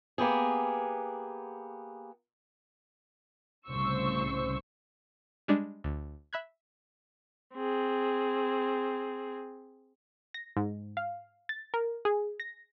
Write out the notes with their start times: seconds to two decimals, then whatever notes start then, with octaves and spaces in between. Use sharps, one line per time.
0.18 A#3 B3 G4 G#4
3.67 C2 A2 C#3 C5 C#6 E6
5.48 G3 G#3 D4
5.84 D2
6.33 E5 B5 F#6 G#6
7.55 C4 G#4
10.34 A#6
10.57 G#2
10.97 F5
11.49 A6
11.74 A#4
12.05 G#4
12.40 A#6